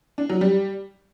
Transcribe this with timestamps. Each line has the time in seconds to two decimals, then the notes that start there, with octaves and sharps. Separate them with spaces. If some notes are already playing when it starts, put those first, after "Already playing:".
0.18 D4
0.30 F#3
0.41 G3